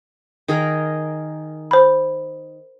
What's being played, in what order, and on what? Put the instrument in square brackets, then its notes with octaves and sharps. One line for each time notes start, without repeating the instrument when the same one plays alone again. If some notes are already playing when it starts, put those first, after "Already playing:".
[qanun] D#3 G#4 A#4
[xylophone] C5 B5